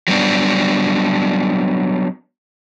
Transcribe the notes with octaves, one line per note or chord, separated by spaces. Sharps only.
F#3 G3 B3 D4